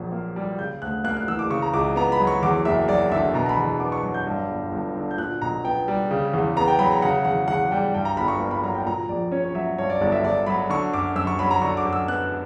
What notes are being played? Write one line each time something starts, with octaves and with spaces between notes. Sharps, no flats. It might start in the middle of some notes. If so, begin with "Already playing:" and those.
Already playing: A#1 A#2 F#3
A#3
G3
C#3 G6
D2 F#6
A#3 F#6
F#6
E3 E6
D6
C#3 C#6
A#5
C#2 D6
B3 A#5
B5
F#3
C#6
E2 D6
F#1 E5
F#3 D5
D3 E5
B2 A#5
A#5
B5
E2
B3 D6
C#6
F#3
G6
G2
G1
G1
D3
G6
A#2 F#6
B1 A#5
B3 G5
G3
C#3
E2
B3 A#5
G5
F#3 B5
A#5
C#3 F#5
E2 F#5
E2 F#5
G3 G5
G2 G5
A#5
G1 B5
C#6
A#3
B5
F#3 A#5
G5
A#2 A#5
A#1 D5
C#4 C#5
C#5
F#3 E5
G2 C#5
D5
G1 D5
E5
G1 D5
F#3 B5
D3 C#6
F#2 D6
F#2 E6
C#6
F#3 B5
A#5
D3 C#6
D6
F#2
E6
B3 F#6